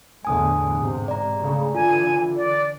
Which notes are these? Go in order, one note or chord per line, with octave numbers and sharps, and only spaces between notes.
E2 A2 D3 G#5 D#6
G#2 C3
D5 A#5
C#3 A3
D3 E3 F4 G#5
D5